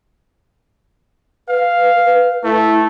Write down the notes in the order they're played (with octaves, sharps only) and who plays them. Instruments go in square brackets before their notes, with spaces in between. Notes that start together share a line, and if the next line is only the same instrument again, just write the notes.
[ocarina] B4 [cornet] F5
[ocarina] B4
[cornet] A3 [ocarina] E4